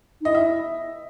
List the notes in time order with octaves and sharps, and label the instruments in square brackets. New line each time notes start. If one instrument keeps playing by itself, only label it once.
[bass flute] D#4
[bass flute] E4 [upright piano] D#5
[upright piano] E5